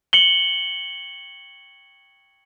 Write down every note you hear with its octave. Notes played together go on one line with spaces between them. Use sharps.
C#7 F#7 G7